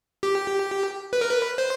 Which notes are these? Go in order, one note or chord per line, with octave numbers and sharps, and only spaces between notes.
G4
B4
A#4
B4
C5